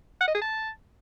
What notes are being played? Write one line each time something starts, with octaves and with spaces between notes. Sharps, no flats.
F#5
D#5
G#4
A5